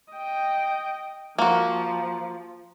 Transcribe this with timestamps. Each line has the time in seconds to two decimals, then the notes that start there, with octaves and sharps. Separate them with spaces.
0.13 D#5 G5
1.38 F3 A#3 F#4